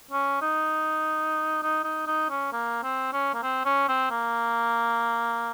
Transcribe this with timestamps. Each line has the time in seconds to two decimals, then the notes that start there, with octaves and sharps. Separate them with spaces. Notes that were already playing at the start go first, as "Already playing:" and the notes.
0.11 C#4
0.42 D#4
1.62 D#4
1.84 D#4
2.07 D#4
2.30 C#4
2.52 A#3
2.83 C4
3.13 C#4
3.34 A#3
3.43 C4
3.65 C#4
3.88 C4
4.10 A#3